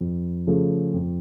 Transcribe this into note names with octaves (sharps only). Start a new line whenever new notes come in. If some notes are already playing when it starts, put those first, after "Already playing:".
F2
C#3 F3 A3
F2